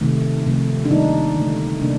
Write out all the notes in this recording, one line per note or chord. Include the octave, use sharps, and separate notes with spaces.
C3 D#3 A3
C3 F3 A3
D4
D#3 G3 A#3 D#4
D3 A3
C3 G3 A#3 D4